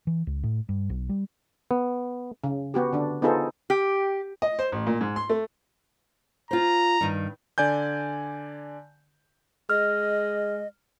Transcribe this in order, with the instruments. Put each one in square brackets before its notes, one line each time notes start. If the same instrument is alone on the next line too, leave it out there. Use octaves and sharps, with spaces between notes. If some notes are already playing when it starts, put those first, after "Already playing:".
[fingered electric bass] E3
C#2
A2
G2
B1
G3
[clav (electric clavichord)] B3
[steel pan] C#3
B3 F#4 G4
D3 D4
B3 D#4 F4 G#4 A4 C5
[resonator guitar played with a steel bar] G4
[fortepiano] D#5
C5
A1
A#2
G#2
C6
A3
[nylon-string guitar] F4 C5 [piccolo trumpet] A#5
[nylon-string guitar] G2 D#3
[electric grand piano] D3 D5 G#5 G6
[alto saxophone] G#3 [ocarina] D#5 [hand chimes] F6